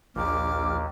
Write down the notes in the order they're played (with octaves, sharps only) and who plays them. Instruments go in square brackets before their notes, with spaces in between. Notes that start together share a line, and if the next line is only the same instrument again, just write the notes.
[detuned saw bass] A#1 [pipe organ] D#2 [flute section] D6 F6